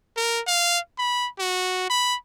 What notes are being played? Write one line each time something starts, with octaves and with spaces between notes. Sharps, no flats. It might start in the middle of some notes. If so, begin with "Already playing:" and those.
A#4
F5
B5
F#4
B5